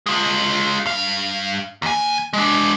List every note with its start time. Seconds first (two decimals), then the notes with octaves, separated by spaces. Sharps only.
0.06 G#3 F4
0.86 G2 F5
1.82 D#2 G#5
2.33 G#3 D4